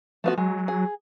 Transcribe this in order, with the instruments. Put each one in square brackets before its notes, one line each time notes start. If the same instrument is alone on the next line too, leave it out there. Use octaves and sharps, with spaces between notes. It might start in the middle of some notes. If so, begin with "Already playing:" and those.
[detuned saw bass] F3 [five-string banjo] A3 B3 F#4
[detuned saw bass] F#3 [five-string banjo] G#3
[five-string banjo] G#4